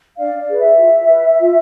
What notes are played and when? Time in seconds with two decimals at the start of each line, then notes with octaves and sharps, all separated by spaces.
0.18 D4 D5 F5
0.38 D5
0.49 G#4 B4
0.59 E5
0.79 F4
1.09 B4
1.40 F4